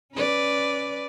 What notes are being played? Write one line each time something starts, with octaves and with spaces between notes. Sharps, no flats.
C#4 B4 D5